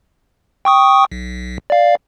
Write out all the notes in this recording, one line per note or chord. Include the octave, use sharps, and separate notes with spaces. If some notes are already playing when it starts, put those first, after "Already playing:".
G5 C#6 D#6
B1
D5 F5